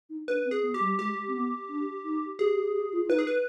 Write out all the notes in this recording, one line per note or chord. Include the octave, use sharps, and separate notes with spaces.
D#4
D4 B4
C4
G#4
B3
G4
G3
G#3 G4
C4
B3
D4
D#4
G4 G#4
G4
G4
F4
F4
D#4 B4
G#4
B4